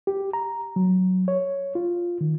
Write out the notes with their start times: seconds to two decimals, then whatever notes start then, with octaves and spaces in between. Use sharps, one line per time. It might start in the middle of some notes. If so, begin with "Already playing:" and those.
0.07 G4
0.33 A#5
0.76 F#3
1.28 C#5
1.75 F4
2.21 D#3